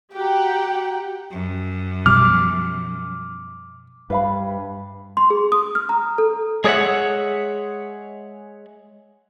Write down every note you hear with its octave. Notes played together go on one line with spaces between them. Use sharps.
F#4 G4 F#5 G5 A#5
F#2
B2 F3 G3 D6 F6
G2 B4 F5 B5
C6
G#4
D#6
F6
A#5
A4
G#3 G#4 C#5 D5 E5 F#5